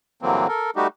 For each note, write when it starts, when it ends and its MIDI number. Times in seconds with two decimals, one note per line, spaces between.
0.22 0.47 43
0.22 0.47 50
0.22 0.47 52
0.22 0.47 54
0.22 0.47 58
0.22 0.47 60
0.48 0.70 69
0.48 0.70 70
0.76 0.87 55
0.76 0.87 57
0.76 0.87 63
0.76 0.87 66
0.76 0.87 67